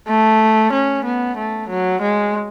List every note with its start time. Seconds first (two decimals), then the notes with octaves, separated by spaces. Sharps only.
0.08 A3
0.72 C#4
1.04 B3
1.37 A3
1.68 F#3
2.01 G#3